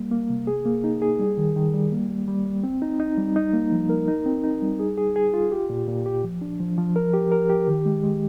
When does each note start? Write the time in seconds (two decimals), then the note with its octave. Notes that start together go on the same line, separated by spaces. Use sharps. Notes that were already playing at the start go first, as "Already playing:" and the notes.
Already playing: G3 A#3
0.11 A#3
0.29 C3
0.47 G#4
0.65 A#3
0.84 D#4
1.02 G#4
1.20 G3
1.37 D#3
1.56 D#3
1.74 G3
1.92 A#3
2.10 G3
2.28 G3
2.46 G3
2.64 C4
2.82 D#4
3.00 D#4
3.17 G3
3.36 D#4
3.54 A#3
3.72 F3
3.90 A#4
4.08 D#4
4.25 C4
4.43 D#4
4.62 G3
4.79 G#4
4.97 G#4
5.16 G#4
5.34 F4
5.52 G4
5.70 A#2
5.87 A#2
6.06 G4
6.24 F3
6.42 D4
6.60 F3
6.78 F3
6.96 A#4
7.14 G4
7.32 A#4
7.49 G4
7.68 D#3
7.85 G#3
8.03 G#3